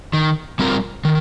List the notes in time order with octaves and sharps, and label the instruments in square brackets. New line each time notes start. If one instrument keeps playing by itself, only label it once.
[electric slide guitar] D#3
G3 C4 F4 A#4
D#3